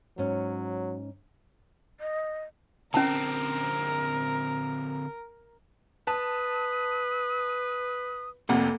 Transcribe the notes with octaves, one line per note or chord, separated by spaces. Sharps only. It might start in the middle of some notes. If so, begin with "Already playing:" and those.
G#2 F#3 C#4
D#5
D3 C4 C#4 A#4 A5
B4 A5 D#6
F1 F2 C3 A#3 A4 F#5